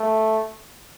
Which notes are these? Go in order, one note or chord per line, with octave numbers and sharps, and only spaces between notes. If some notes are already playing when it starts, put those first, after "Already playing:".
Already playing: A3